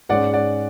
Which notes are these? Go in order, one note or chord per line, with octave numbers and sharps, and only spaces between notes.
G#2 G#3 C#4 D5 F#5
D5 F#5